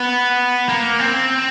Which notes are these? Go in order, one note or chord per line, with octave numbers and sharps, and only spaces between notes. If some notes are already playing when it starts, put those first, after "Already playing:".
Already playing: B3
A#3
C4